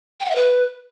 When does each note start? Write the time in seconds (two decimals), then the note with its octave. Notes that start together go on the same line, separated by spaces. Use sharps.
0.20 G5
0.25 F#5
0.30 E5
0.35 B4